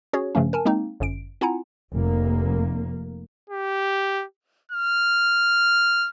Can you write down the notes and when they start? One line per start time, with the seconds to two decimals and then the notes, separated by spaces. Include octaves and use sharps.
0.13 C#4 F#4 G#4 C#5
0.35 G2 C#3 F3 A3 C#4
0.53 A#4 G#5 A5
0.65 G#3 A#3 C4 D#4
1.00 G1 F#2 D7
1.41 C4 E4 F4 F#5 G#5 A#5
1.92 F1 A#3
3.50 G4
4.72 F6